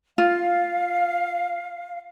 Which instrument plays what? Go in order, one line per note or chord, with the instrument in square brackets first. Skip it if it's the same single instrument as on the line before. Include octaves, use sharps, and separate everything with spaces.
[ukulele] F4 [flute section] F5